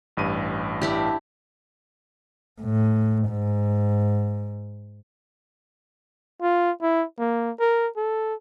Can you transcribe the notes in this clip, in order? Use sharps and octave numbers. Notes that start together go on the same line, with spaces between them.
A1 G2 D#7
D4 E4 G4
A2
G#2
F4
E4
A#3
A#4
A4